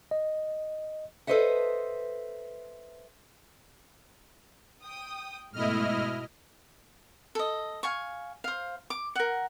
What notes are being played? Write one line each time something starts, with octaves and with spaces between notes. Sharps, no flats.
D#5
A4 B4 C5 D#5 E5 F#5
G5 D#6
G#2 B2 A3 E4 D#5 F6
A4 D#5
F5 G#5 C#6
C5 F5
D6
A#4 F#5